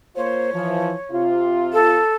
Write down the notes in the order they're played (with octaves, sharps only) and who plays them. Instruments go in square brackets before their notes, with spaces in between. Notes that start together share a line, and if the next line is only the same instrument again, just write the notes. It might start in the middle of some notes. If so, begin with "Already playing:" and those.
[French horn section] A#3 F4 C5 [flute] C#5
[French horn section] E3 F3
C3 F4
[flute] A4